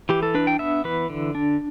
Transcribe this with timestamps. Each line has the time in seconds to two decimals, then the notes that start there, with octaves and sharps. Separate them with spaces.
0.09 E3 G4
0.23 A4
0.35 D4 B4
0.47 G5
0.59 B3 E5
0.84 E3 B4
1.10 D3
1.35 D4